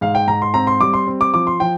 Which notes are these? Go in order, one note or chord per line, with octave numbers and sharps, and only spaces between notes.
G#2 F5
G5
G#2 A#5
C6
C4 A#5
C6
G3 D6
C6
C4
D6
F3 D6
C6
F3 G5